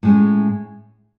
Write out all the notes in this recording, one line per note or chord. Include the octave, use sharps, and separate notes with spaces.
A2 G#3 C#4